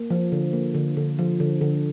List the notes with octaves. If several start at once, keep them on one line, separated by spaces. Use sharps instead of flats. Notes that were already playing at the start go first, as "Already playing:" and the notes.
Already playing: A#3
F3
D3
A#3
D3
D3
F3
D3
D3